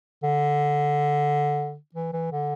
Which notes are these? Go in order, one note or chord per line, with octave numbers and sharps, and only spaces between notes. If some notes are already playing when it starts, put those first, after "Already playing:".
D3
E3
E3
D3